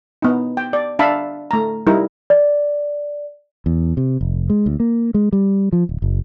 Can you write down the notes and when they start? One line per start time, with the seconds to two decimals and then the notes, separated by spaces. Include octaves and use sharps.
0.22 B3 D#4
0.57 G5
0.73 D5
0.99 D4 E5 F5 A5 B5
1.51 A3 A#5
1.87 G3 D#4 E4 A#4
2.30 D5
3.66 E2
3.97 C3
4.21 F1
4.50 G#3
4.66 D2
4.80 A#3
5.14 G#3
5.32 G3
5.73 F3
5.89 D1
6.02 F#1